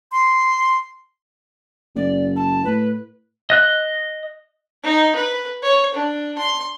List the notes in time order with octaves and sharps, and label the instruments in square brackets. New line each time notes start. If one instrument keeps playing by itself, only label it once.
[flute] C6
[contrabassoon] F#1 [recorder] D5
[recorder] A5
[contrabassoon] A2 [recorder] B4
[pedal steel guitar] D#5 F#6
[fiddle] D#4
B4
C#5
D4
C6